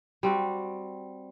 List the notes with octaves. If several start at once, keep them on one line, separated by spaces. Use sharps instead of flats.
G3 C4 F#4